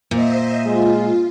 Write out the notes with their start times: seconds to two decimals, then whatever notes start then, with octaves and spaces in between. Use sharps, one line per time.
0.11 A#2 C5 D#5 E5
0.66 G#3 F4